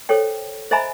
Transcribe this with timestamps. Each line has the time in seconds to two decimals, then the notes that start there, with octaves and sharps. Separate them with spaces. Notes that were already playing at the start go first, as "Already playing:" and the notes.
0.09 A4 C5 C#5 G5
0.71 C5 D#5 E5 G#5 A#5 B5